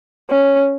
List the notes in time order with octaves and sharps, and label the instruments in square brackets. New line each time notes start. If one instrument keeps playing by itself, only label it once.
[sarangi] C#4